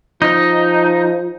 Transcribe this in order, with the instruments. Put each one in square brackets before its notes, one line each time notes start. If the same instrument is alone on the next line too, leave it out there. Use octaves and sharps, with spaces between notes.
[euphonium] F3 [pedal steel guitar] D#4